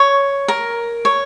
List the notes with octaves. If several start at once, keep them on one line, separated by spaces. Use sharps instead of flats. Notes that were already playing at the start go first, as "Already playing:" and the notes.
Already playing: C#5
A#4
C#5